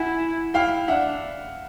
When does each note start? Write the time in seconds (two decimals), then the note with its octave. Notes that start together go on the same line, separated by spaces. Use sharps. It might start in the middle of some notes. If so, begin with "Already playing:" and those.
Already playing: E4 F#5 G#5
0.54 E4 F5 G5
0.88 D4 E5 F#5